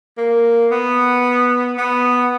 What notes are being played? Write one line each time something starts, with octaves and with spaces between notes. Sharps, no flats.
A#3
B3
B3